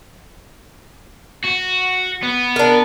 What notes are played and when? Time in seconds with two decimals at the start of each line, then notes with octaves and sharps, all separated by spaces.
1.44 F#4
2.23 B3
2.56 D4 A#4